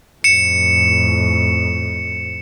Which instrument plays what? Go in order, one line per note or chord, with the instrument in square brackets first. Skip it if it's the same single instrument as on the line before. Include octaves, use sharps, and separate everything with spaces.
[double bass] F2 A2 [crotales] C#7 E7